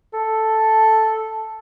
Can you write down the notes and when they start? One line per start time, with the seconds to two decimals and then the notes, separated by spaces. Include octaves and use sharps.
0.14 A4